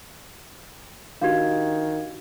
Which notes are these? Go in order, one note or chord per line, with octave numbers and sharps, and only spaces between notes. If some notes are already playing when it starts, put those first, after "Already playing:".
D#3 D4 F#4 G4 F5 G#6